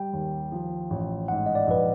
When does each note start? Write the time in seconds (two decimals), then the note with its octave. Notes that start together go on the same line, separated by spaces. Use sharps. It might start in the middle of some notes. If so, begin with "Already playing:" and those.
Already playing: G3 G5
0.13 D#2
0.52 F3
0.90 A1
1.28 G#2 F#5
1.46 D#5
1.55 D5
1.67 A#1 B4